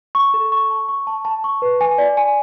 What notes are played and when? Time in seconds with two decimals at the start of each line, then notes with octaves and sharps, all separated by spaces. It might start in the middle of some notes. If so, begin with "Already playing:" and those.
0.15 C#6
0.34 A4
0.52 C#6
0.70 A5
0.89 C#6
1.07 A5
1.25 A5
1.44 C#6
1.62 B4
1.81 G#5
1.98 D5
2.17 G#5